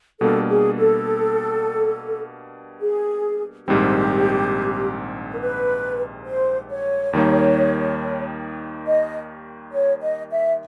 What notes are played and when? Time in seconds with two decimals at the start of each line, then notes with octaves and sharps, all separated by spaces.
0.20 B2 G3 A#3 D4 A4
0.50 G#4
0.79 A4
2.81 G#4
3.67 A#1 G#2 D#3 G3 C4 G4
5.31 A#4
5.41 B4
6.27 C5
6.71 C#5
7.13 D#2 D#3 G3 A#3 D#4
8.87 D#5
9.73 C#5
10.02 D#5
10.32 E5